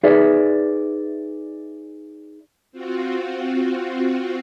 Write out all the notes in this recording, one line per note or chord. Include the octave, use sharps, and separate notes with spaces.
D#4 G#4 B4 D5 E5
C4 F4 F#4